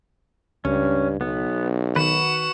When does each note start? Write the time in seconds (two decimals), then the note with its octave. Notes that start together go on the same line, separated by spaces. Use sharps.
0.65 C#2 G2 C#4
1.21 B1 B3
1.96 D#3 F#4 B4 F#5 E7